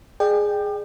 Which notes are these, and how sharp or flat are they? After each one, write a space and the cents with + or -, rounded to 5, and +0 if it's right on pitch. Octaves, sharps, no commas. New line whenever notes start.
G#4 +0 D5 +40 G5 +0